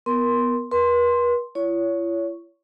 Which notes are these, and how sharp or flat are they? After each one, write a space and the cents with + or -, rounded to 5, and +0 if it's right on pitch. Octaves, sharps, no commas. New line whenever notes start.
B3 +0 A#4 +15 C6 +0
B4 -40 C6 +0
E4 +45 C#5 +25 C#6 +0